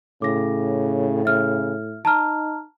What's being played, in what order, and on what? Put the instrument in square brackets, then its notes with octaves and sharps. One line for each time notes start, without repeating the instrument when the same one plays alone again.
[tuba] A2 [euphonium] C#3 [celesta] D6 A#6
[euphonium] C#3 [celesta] E5 F6
[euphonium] D#4 [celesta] A5 A#5 F6